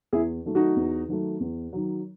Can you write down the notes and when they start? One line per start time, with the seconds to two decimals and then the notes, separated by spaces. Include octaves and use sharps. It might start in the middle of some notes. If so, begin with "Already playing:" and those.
0.12 E2 E4 G#4
0.45 D#3 F#3 A3
0.55 D#4 F#4
0.76 E2
1.09 D#3 F#3 A3
1.40 E2
1.73 D#3 F#3